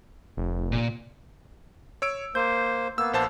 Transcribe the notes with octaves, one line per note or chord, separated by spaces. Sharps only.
F1
A#2
C#5 E6 D7
A#3 C5 G6
A#3 B3 E6
A#1 C5 A5